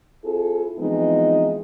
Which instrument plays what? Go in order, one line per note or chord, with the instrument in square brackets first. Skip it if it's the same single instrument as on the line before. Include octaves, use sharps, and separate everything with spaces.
[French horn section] C4 E4 F4 G#4 A4
E3 F3 G#3 B3 C4 D#4